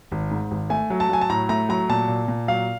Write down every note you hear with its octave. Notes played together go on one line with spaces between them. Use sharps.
G#1
G#2
G#1
A3 G#5
F#3
A5
F#3 G#5
A5
A2 A#5
A3 A#5
F#3 A#5
A#2 A5
A#2
A#2
F#3 F5